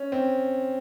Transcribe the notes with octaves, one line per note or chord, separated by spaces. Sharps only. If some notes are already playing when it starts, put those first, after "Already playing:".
Already playing: C#4
C4